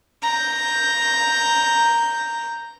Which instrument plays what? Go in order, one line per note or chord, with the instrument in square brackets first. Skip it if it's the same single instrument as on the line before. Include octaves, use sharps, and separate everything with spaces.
[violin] A#5 G6